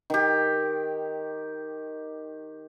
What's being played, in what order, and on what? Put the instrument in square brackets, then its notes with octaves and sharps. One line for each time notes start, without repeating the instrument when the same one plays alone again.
[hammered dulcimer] D#3 G4